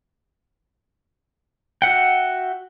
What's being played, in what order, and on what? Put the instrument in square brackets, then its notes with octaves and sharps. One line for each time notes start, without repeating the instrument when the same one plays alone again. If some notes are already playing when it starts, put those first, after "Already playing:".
[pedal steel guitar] F#4 E5 F#5 G5